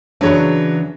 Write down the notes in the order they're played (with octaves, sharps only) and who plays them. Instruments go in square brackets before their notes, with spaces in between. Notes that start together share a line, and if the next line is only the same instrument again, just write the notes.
[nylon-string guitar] C#3 E3 B3 [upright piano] F#3 C#5 [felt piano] D4 G#4